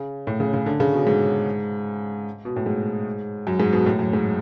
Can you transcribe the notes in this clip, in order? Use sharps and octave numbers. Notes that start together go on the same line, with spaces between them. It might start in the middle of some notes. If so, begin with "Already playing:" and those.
Already playing: C#3
A2
C#3
C#3
D3
C#3
B2
G#2
B2
A2
G#2
F#2
G#2
B2
A2
F#2
G#2